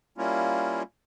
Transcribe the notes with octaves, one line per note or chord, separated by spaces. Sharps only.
G3 A#3 C#4 E4 F4